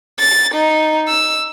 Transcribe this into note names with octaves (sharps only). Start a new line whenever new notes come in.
A6
D#4
E6